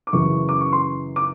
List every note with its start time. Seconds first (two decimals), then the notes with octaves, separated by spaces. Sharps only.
0.07 D6
0.13 F#2 C#3 E3 C#6
0.49 D6
0.61 C#6
0.73 C6
1.16 D6